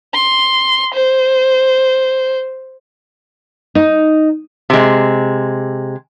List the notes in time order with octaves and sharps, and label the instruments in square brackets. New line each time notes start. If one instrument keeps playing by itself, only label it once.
[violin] C6
C5
[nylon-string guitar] D#4
[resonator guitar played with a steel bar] C3 G#3